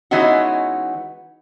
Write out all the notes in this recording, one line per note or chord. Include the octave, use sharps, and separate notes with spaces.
E3 G#3 B3 C#4 D#4 F#4